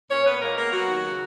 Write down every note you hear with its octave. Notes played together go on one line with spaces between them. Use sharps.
A#2 C#4 C#5
A#2 B3 B4
G#3 A#3 A#4
A#3 B3 A#4
F#3 B3 F#4
D#2
C#3